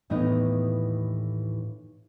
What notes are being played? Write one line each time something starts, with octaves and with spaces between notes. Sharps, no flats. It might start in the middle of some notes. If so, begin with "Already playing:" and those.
D#2 A2 E3 A3 B3 D#4